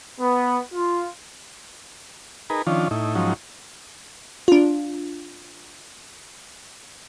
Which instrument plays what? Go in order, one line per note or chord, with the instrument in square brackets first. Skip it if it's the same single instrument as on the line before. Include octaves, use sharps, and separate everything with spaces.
[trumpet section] B3
F4
[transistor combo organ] D#4 G#4 A#4 B4
D#3 F3 C#4 D4 F4
A2 D#4 E4
G#2 F3 F#3 C#4 D#4
[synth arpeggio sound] D4 F4